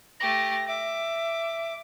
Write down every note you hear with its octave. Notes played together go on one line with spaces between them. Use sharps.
A3 G4 A#6
E5 D6